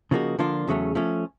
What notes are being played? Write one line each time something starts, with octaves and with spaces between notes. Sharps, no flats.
C#3 F3 A#3 D#4 F#4
D3 F3 A#3 D4 F4
E2 C#3 F#3 A3 C#4
F3 A3 C#4